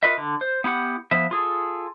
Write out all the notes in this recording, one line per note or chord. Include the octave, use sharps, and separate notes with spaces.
F4 A#4 B4 D#5 E5
D3
C5
B3 E4 G4 F#5
F3 B3 E5
F4 G#4 A4